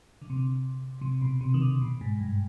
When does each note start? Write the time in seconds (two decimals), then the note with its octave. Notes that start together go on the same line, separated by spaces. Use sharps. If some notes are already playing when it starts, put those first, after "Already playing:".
0.21 D3
0.30 C3
0.36 D3
1.01 C3
1.21 B2
1.41 C3
1.54 D#3
1.61 D3
1.82 B2
2.01 G#2
2.20 G2